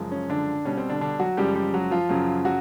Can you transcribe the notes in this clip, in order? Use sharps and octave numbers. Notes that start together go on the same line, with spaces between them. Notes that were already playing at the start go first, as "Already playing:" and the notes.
Already playing: F#2 C#3 F3 G#3
C#4
D3 D4
B2 G3 C#4
C4
D3 D4
D3 D4
F#3 F#4
F#2 C#3 F3 G3 G#3 G4
G3 G4
F#3 F#4
F3 F4
F#2 C#3 F#3
F#3 F#4